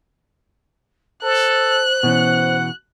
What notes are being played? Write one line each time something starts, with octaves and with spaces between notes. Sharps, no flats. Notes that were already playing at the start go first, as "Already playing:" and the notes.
A4 C5 F#6
B2 E3 C#4 F#5